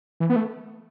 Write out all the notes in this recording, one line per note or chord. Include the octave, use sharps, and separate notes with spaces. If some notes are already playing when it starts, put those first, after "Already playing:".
E3
B3
A3